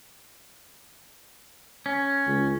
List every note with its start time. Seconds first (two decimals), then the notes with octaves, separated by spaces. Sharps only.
1.86 C#4
2.27 C#2